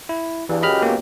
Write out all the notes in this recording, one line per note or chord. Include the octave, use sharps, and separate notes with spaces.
E4
E2 G2 E3
C#2 F#2 G4 D#5 B5 F6
A#3 B3